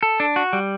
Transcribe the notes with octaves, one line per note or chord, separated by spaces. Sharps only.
A4
D4
F#4
G3